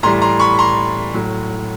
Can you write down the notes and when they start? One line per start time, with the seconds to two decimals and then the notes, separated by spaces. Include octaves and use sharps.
0.03 A2 E3 G3 A#5 C6
0.22 A#5 C6
0.39 B5 C#6
0.59 A#5 C6
1.13 A2 F#3